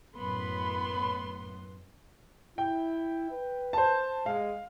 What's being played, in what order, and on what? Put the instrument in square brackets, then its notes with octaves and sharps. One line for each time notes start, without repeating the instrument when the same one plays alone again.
[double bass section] F#2 A2 [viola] B3 C6 [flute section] B5
[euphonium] E4 [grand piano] G5
[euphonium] B4
[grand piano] C5 A5
[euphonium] G#3 [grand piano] F5